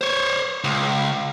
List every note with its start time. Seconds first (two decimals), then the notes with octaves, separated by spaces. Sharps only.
0.01 C5 C#5
0.64 C#2